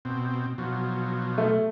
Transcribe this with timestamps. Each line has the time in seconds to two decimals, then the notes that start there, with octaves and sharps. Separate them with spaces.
0.05 B2 C4
0.58 B2 F3 F#3
1.38 A3